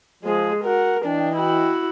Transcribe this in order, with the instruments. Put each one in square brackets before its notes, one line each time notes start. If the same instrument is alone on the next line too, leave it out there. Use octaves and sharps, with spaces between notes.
[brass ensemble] F3 [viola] G#3 G#4
[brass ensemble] F#4 F#5 [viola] A#4
[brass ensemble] E3 D#5 G5 [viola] D4
[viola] E4 F#4